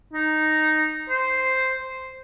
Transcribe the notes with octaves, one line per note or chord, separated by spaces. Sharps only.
D#4
C5